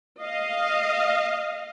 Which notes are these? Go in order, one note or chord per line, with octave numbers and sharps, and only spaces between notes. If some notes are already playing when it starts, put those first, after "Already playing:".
D#5 F5